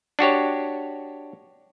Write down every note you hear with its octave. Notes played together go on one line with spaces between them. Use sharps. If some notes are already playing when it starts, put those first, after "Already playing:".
D4 F#4 G4 C#5